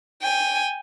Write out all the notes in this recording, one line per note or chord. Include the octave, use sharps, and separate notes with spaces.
G5 G#5